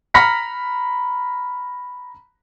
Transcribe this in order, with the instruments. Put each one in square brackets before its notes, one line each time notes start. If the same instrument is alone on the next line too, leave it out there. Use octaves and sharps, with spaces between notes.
[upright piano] A#5 B5 F6 A#6 B6 C#7